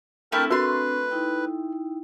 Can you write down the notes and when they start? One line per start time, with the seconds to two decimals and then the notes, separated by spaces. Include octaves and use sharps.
0.32 A3 C4 D4 E4 A#4 G5 A5
0.51 A3 F#4 A#4 B4 C6
1.11 D#4 E4 G5